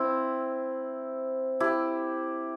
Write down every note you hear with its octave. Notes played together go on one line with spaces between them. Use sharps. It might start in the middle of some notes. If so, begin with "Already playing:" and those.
Already playing: C4 E4
E4 G4